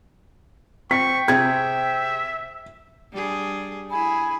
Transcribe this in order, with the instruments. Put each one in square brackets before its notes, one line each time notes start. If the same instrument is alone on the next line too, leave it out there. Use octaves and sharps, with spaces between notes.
[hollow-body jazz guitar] C4 [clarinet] G5 [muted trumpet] C#6 [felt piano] B6
[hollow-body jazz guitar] C3 C4 G#4 [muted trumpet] E5 [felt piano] G#6
[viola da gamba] G3 D4 G#4
[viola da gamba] E4 G#4 [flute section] G#5 B5